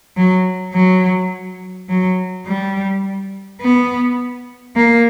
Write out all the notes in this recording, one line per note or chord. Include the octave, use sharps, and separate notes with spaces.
F#3
F#3
F#3
G3
B3
A#3